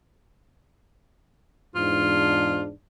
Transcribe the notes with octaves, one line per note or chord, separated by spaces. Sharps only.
E2 G#2 D4 F4